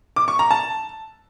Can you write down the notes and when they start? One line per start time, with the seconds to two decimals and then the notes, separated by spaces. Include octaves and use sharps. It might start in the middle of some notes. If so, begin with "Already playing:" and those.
0.16 D6
0.28 C#6
0.39 A#5
0.51 A5